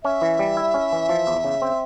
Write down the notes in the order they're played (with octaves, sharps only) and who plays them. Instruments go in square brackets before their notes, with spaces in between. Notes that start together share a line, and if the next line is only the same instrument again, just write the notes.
[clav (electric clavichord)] C#4 [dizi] E5
[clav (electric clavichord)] E3
G3
E4
C#4
E3
F3
E2
C#3
C4